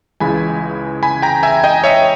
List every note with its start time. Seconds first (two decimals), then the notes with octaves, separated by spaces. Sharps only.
0.20 C#2 C#3 E3 G#3 G#5 B5
1.03 G#5 B5
1.22 G5 A#5
1.43 E5 G#5
1.64 D#5 G5
1.84 C#5 E5